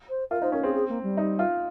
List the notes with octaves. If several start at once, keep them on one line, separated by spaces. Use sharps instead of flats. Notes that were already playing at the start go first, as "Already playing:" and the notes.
C5
F4 A#4
D#4 C5
C#4 A#4
C4 G#4
G#4
A#3
G3
D#4
F4